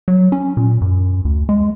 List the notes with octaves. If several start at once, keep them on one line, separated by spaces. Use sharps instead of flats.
F#3
C#4
A#2
F#2
D2
G#3